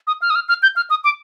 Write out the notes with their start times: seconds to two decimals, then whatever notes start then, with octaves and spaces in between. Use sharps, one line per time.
0.07 D#6
0.22 F6
0.30 D#6
0.35 F6
0.49 F6
0.63 G6
0.76 F6
0.90 D#6
1.04 D6